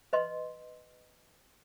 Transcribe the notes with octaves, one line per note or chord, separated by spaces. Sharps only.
B4 D#5 C6